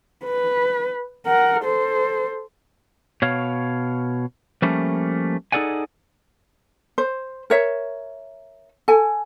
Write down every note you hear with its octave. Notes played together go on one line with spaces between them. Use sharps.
B4
A#4 F#5
A4 C5
B2 C#5 F5
F3 G3 A3 A#3 C#4
D#4 G#4 A4 D5 F#5 G#5
C5
A#4 C#5 E5
A4 G#5